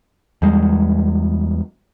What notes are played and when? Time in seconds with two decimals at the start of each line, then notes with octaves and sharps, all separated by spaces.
0.42 E2 G3 G#3